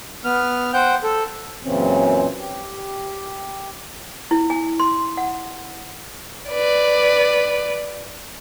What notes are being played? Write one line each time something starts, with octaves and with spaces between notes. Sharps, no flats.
B3 F6
C5 F#5 G5 G6
A4
F#2 A#2 C#3 E3 C4 C#4
G4
E4
G#5
C6
F#5
B4 D5